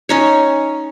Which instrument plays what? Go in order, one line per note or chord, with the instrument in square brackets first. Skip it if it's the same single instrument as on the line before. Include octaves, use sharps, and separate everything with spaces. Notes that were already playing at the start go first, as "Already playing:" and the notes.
[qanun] C#4 D#4 C#5